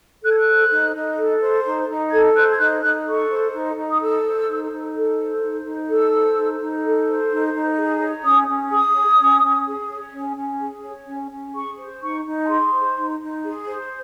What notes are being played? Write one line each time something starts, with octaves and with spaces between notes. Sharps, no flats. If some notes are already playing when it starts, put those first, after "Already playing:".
A4 F#6
G#6
F#6
C5
D#4
D#4
A4
C5
D#4
D#4
A4 G#6
C5 F#6
G#6
D#4 F#6
D#4 F#6
A4 C#6
C5
D#4
D#4
D#6
A4 E6
C5
D#4
D#4
A4
C5
D#4
D#4
A4 E6
C5
D#4
D#4
A4
C5
D#4
D#4
G#4
C#5
C#4 D#6
C#4
G#4 D#6
C#5
C#4
C#4
G#4
C#5
C#4
C#4
G#4
C#5
C#4
C#4
G#4 C#6
C5
D#4 C#6
D#4
A5
G#4 C6
C5
D#4
D#4
G#4
C5